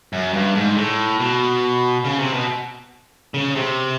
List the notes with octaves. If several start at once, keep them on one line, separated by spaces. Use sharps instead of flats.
F#2
G2
G#2
A2
B2
C#3
C3
B2
C#3
C3